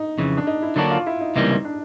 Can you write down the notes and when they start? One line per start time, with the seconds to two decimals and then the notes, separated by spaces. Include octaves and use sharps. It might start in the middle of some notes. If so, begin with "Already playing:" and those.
Already playing: D#4
0.18 F2 C#3 E3
0.37 D4
0.47 D#4
0.62 E4
0.76 D3 F#3 A#3 D4 F#4
0.91 F4
1.06 E4
1.20 D#4
1.35 C#2 C3 E3 G3 A#3 D#4
1.49 D#4
1.65 D4